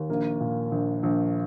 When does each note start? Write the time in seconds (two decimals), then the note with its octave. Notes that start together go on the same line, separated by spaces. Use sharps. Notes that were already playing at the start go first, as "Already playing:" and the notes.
Already playing: D#2
0.09 A#1 A#3
0.40 A#2
0.71 A#1
1.03 A#1